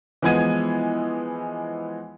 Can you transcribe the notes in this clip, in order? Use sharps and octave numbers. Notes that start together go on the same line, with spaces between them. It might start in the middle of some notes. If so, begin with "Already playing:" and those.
E3 F3 G#3 B3 G#6 D#7